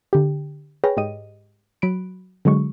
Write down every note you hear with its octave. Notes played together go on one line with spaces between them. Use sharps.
D3 G4
G#4 B4 C#5 G5 F6 A#6
G#2 G#3 G4 D#5 D#7
F#3 B5 F#6 D7
D3 F#3 G#3 C#6